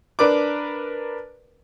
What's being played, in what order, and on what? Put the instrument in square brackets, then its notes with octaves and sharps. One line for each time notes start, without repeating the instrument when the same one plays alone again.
[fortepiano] D4 A#4 B4 D5 D6